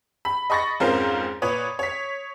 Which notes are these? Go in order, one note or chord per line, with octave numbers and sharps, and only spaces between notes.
B5
D#5 B5 C#6 A6 A#6
F2 G#2 C#4 F4 A#4 C5
A#2 B4 C#5 D#6
C#5 B6